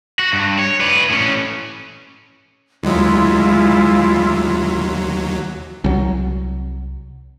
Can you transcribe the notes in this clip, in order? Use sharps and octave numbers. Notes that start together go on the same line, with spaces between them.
F#4
G2
C#5
B4 D5
A2 C#4
D#2 F#3 G#3 E4 F4
C2 F#3